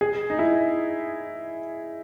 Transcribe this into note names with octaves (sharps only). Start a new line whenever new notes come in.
G#4
D#4
E4